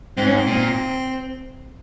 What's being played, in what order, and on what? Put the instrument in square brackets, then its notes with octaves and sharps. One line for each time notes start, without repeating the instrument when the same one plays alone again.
[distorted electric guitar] G#2 [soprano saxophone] C4
[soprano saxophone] C#4
C4
[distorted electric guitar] A#2